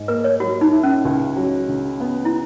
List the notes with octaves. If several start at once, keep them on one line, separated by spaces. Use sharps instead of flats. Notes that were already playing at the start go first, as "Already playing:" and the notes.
Already playing: G#2
A#3 B4
C#5
F#3 F#4
D#4
E4
C#4
C#2
F#3
C#3
B3
E4